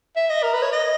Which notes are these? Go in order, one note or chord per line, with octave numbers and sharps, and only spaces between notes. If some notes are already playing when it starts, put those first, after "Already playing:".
E5
D#5
A#4
B4
C#5
D#5